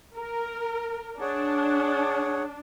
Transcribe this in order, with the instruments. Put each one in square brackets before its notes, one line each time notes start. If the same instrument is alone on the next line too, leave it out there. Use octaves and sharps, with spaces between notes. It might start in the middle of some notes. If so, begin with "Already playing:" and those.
[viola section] A#4
[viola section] D4 [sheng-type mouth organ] G#4 C#5 F#5